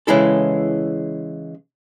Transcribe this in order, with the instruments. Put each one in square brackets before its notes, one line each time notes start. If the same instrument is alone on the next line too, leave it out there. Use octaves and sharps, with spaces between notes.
[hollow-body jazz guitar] C#3 E3 G#3 E4 A4